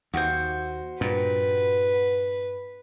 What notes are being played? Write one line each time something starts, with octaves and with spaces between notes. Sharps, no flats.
D#2 F#4 C5
G2 A#2 B4